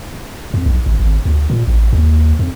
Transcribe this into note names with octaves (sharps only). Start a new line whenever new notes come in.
F2
B1
G#1
G#1
D2
A#2
A1
D#2
F2